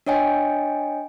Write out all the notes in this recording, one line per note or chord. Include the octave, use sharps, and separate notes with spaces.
D4 C#5 D#5 G5 G#5